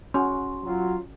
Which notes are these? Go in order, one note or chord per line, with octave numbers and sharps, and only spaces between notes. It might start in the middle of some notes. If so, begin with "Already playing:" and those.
C#4 F#4 C6
F#3 F4